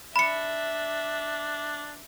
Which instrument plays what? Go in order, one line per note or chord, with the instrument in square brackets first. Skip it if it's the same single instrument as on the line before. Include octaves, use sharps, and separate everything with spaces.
[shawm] D4 [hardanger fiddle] E5 [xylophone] B5 C#7